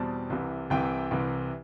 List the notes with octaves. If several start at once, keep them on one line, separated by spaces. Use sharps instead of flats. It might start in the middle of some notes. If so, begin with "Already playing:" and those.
Already playing: E2 B2 G3 C4 A5
C2 C3 E3
C2 C3 E3 G5
C2 C3 E3